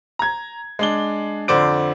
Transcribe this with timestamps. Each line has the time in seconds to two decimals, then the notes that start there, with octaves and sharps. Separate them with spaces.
0.19 A#5 G#6
0.79 G#3 D4 G7
1.48 F2 D3 C5 D5 D7